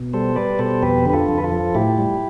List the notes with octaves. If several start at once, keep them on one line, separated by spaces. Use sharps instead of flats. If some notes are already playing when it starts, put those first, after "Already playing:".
Already playing: B2
G3 A4 C5
G3 B4 D5
B2 A4 C5
F2 G4 B4
D3 B4
F4 A4
F2
B4
F4 A4
F3
A2 E4 G4
G3